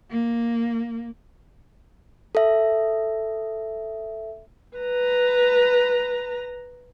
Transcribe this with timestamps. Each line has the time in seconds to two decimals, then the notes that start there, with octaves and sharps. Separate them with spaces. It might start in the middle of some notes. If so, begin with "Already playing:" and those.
0.11 A#3
2.35 A4 E5
4.78 B4 A#5